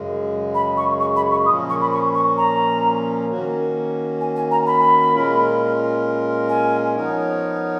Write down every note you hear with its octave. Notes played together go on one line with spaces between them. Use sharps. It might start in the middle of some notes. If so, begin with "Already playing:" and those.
Already playing: F#2 C#3 G#3
B5
C#6
C#6
B5
C#6
A#2 F3 A#3 C#4 D#6
C#6
B5
C#6
C#6
A#5
D#3 A#3 C#4 F#4
G#5
G#5
A#5
B5
A#2 G#3 C#4 F4 A#4
G#5
F3 B3 D#4 A#4 C#5